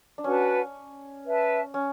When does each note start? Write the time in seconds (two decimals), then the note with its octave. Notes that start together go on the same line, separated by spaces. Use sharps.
0.18 D4
0.24 C#4 F#4 B4 F#5 A5
1.24 B4 E5 A5
1.74 C#4